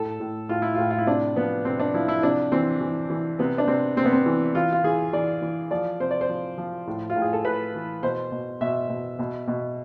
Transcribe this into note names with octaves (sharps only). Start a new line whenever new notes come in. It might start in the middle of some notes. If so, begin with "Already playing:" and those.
Already playing: A2 A4
A2
A2 F4
E4
A2 F4
F4
E4
C3 D4
F3 B3
C3 C4
D4
F3 E4
E4
C3 D4
E3 C4
E3
E3
C3 B3
D4
C3 C4
C3 C4
B3
C4
E3
E3 F4
F4
E3 G#4
E3 D5
E3
F3 D5
C3 C5
D5
C5
F3
F3
A2
F4
A2
G#4
A4
A2 B4
E3
B2 C5
B2
B2 E5
B2
B2
B2